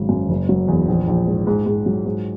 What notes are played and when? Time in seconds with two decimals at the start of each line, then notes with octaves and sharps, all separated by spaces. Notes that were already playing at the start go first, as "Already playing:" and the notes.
Already playing: G#1 C#3 F#3
0.09 F#2
0.29 F#1
0.49 F#3
0.68 E2
0.88 A#1
1.08 A#1
1.27 G#2
1.47 G#2
1.66 G#2
1.86 F#3
2.06 G#2